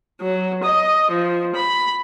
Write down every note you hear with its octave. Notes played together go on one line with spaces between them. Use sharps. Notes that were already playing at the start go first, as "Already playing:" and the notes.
F#3
D#5
F3
B5